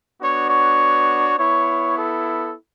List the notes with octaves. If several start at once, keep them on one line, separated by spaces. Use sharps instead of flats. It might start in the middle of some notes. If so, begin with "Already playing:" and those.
B3 D4 F#4 C#5
C#5
B3 E4 C#5
A4